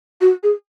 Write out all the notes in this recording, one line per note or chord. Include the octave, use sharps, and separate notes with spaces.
F#4
G#4